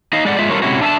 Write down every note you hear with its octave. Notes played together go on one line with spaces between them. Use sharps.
D#4 D#5 F5
G#3 D5 F#5
G#3 F4 E5
G3 A3 C4 F4 A#4 C#5
C3 G#3 C#4 E4 F#4
D4 E5 G#5 A5